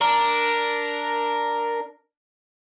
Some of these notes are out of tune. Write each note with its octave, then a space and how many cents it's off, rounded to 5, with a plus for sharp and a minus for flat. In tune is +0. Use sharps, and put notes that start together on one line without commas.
D4 +0 A#4 +0